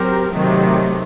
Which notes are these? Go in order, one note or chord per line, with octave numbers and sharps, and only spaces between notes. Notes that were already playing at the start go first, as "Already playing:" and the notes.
Already playing: F#3 C4 G4 A#4
C3 D#3 F#3 A3